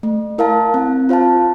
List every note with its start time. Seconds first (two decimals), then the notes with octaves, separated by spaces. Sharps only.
0.03 A3
0.38 E4 A#4 F5 A5
0.74 C4
1.09 F4 C5 F5 A5